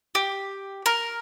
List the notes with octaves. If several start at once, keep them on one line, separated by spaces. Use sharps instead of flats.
G4
A#4